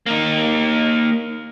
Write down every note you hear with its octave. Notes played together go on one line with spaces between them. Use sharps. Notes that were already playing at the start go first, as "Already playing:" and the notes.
A#3 D#4